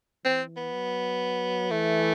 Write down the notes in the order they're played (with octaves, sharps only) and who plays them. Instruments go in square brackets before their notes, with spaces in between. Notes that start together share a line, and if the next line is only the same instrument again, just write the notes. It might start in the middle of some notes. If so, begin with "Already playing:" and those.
[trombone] E3 [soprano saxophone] C4
[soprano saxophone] B3
[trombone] F#3
[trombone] E3 [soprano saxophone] A3